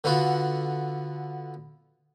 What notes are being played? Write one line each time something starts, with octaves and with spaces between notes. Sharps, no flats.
D3 B3 F4 F#4